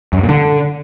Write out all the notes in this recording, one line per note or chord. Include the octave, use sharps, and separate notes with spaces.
F#2
G2
A#2
D3